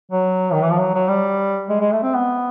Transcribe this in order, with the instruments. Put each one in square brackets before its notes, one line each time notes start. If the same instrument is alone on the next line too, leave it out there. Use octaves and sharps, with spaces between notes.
[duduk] F#3
D#3
E3
F3
F#3
F#3
G3
G#3
G#3
A3
C4
B3